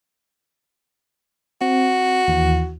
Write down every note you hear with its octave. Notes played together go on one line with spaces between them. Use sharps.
C4 F#4
D#2 E3